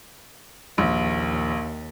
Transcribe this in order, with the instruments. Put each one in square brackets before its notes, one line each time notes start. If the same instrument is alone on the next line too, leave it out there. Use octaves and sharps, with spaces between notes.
[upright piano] A#1 [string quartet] D#2